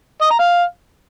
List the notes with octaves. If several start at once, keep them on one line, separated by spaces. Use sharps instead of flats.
D#5
A#5
F5